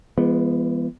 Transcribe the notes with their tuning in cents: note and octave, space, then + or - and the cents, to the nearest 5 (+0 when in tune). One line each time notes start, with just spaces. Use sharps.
E3 +45 G#3 -15 B3 -10